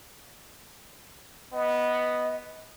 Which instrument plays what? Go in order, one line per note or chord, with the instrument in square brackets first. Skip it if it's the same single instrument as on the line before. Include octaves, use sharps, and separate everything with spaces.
[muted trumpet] B3 [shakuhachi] D#5